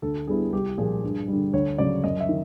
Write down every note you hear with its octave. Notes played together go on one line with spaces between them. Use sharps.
D2 A4
D3 G3 B3 E4 G#4
C2 G4
A#2 F3 G#4
G2
D3 G3
D2 C#5
C#3 F#3 D5
F#2 D#5
E5
D#3